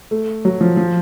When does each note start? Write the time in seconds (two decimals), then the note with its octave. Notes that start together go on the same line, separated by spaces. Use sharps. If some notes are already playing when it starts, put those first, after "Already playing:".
0.11 A3
0.45 F#3
0.61 F3
0.77 F3